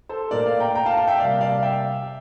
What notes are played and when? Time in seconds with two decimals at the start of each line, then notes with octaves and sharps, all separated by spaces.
0.09 A4 C5
0.31 A#2 A3 A#4 D5
0.46 D5 F5
0.60 G5 A#5
0.75 G5 A#5
0.86 F5 A5
0.97 F5 A5
1.07 E5 G5
1.19 C3 G3 A#3 D5 F5
1.41 D5 F5
1.63 E5 G5